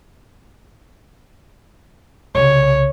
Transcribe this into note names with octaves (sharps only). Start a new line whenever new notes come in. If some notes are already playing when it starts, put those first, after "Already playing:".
C2 C#3 C#5